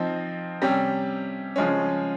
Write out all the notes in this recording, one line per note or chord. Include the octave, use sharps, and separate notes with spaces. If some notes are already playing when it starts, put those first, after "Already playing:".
Already playing: F3 C4 D#4
C3 G3 C#4 G4
C#3 F3 G#3 C#4